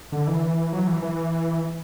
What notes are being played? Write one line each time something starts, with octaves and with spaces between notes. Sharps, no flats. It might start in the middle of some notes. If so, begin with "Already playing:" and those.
D3
E3
F#3
E3
E3